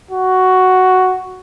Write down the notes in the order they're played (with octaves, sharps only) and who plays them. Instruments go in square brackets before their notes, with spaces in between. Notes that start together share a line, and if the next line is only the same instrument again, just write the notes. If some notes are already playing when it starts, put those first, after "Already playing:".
[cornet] F#4